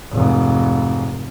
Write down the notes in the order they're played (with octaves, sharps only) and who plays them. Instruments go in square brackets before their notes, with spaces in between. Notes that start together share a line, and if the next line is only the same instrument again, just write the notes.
[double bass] F1 G#2